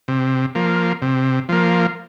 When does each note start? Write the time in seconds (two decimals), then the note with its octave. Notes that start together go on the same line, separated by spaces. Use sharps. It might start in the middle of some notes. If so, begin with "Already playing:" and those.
0.08 C3
0.55 F3 A#3
1.02 C3
1.49 F3 A#3